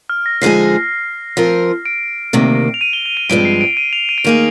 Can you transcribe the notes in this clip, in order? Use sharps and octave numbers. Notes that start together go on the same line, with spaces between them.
F6
A#6
D3 F3 G#3 D#4 G#4 C7
F3 C4 F4 A#4
D7
D2 C3 D#3 A#3
F7
D#7
G7
F7
D#7
G2 F3 G#3 C4 D7
C7
D7
D#7
F7
D#7
D7
D#3 A#3 D#4 G#4 D#7